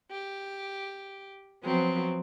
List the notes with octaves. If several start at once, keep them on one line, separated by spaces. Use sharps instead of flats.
G4
F3 F#3 B3 C4